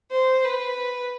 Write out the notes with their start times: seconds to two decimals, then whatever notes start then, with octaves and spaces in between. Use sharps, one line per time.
0.12 C5
0.45 B4